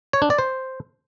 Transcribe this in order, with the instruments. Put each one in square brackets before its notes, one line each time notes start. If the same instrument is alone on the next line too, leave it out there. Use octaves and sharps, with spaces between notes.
[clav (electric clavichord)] C#5
D4
D5
C5